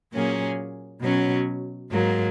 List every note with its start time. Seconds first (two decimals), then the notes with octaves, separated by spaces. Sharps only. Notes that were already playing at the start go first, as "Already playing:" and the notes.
0.12 A#2 F#3 A#3 C#4 G#4
1.01 B2 F#3 C#4
1.91 G#2 F#3 A#3